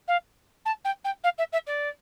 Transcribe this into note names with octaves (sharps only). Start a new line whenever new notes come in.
F5
A5
G5
G5
F5
E5
E5
D5